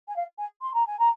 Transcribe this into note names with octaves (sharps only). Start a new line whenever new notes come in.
G#5
F5
G#5
C6
A#5
G#5
A#5